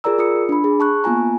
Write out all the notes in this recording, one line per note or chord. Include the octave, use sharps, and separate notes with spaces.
F4 G#4 A#4 D5 A#5 E6
F4 D#6 C#7
D4 B5
G#4
A5 C#6 F#6
A#3 B3 F4 G#5 A#5